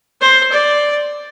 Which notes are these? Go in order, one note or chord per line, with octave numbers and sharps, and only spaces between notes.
C5
D5